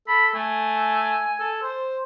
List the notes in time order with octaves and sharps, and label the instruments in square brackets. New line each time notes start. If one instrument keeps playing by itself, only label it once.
[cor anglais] A4 [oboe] B5
[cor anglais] A3 [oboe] G#5
[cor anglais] A4
C5